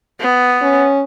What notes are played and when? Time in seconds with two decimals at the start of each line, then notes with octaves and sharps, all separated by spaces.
0.20 B3
0.62 C#4